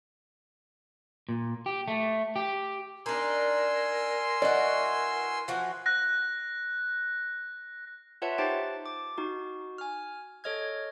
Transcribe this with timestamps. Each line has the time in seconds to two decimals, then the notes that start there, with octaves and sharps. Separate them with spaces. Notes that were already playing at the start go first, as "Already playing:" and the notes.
1.29 A#2
1.66 G4
1.88 A3
2.36 G4
3.06 D4 D#4 A#4 G#5 C6 E6
4.42 E3 F#4 D5 D#5
5.48 E3 F3 F#4
5.86 F#6 A#6
8.22 F4 B4 C#5 E5 F#5 A5
8.38 D#4 G4 C5 G5 A5 A6
8.86 D6
9.18 D#4 F#4
9.78 G#5 F6
10.44 A4 C#5 D#5 F6 G#6